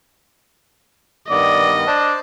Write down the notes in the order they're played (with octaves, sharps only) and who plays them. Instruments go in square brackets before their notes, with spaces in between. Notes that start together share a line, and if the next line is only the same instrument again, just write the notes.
[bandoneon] G2 D#3 B3 [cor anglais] D5 [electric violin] D#5
[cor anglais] D4 [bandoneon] C5 D5 A5